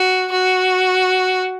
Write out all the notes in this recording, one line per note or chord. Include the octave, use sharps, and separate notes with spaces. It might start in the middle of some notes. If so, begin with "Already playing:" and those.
Already playing: F#4
F#4